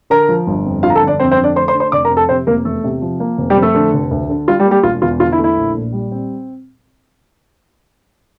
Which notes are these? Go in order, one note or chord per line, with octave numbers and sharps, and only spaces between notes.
D3 A#4 A#5
F3
G1
F2
D3 F4 F5
A#5
A4 A5
G1
D4 D5
F2 C4 C5
C4 C5
D3
D4 D5
A3 C5 C6
C5 C6
D4
C5 C6
F1 D5 D6
A#4 A#5
F2
A4 A5
C3 C4 C5
F1 A#3 A#4
E2 A3 A4
C3
F3
A#3
F1
G3 G4
F2
A3 A4
D3
F1
D2
D3
G3 F4
G3 G4
A#3
G3 G4
E1 F4
E2 F4
D3 F4
E4
A3
E4
A#1
A#2
G3
C4